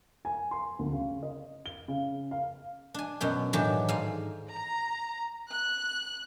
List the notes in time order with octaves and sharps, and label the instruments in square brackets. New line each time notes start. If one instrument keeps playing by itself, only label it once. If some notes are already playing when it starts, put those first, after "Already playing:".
[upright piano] G#5
C6
D2
C#3
D#5
G7
C#3
F5
[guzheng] D4 G#5
F#2 B2 G5
A2 D#3 E3 F#3 D4 G4
G#2 F5 G#5
[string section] A#5
F#6